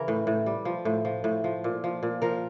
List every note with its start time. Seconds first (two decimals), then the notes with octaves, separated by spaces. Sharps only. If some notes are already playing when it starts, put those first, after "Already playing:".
Already playing: C#3 E3 A#4
0.08 A2
0.27 A2
0.46 G3
0.65 F3
0.85 A2
1.05 F3
1.24 A2
1.44 F3
1.64 A#2
1.84 F3
2.03 A#2
2.22 F3 A#4